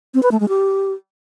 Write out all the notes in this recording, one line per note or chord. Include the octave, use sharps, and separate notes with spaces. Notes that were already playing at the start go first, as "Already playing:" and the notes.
C4
B4
A3
G#3
G4